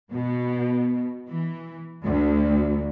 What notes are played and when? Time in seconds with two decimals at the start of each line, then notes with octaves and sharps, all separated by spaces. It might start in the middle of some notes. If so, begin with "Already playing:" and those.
0.13 B2
1.31 E3
2.05 D2